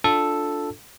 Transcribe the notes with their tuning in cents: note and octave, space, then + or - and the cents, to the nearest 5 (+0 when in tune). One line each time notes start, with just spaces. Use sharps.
D4 +0 F4 +15 A4 +0